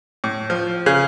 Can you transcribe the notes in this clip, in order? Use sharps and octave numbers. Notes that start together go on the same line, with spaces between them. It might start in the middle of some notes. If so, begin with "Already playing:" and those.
A2
F3
C#3